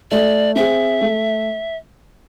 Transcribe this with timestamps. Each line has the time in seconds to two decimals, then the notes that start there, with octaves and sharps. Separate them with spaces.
0.11 A3 D5
0.55 C4 G#4 E5
1.01 A3